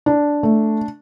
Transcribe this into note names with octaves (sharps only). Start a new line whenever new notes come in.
D4
A3